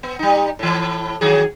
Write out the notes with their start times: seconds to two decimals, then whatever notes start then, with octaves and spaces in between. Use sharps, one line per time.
0.03 B3
0.19 G3 D#4
0.59 A2 E3
1.21 D#3 F#3 G#4